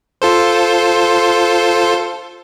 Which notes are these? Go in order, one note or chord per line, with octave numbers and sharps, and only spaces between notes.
F4 A4 C5